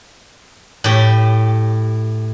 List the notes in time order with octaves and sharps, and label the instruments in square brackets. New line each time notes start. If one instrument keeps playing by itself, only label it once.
[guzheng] A2 G4